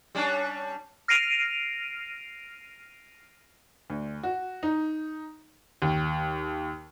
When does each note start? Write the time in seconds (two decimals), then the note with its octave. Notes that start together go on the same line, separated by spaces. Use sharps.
0.15 G3 C#4 D4
1.08 F6 A#6 C7 D7 D#7 F7
3.90 D2
4.23 F#4
4.63 D#4
5.82 D#2